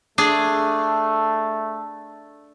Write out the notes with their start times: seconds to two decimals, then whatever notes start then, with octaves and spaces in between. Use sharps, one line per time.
0.18 A3 D4 G#4